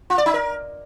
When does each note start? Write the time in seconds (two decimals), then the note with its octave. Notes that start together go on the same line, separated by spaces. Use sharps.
0.10 F4
0.18 D5
0.26 D#4
0.34 A#4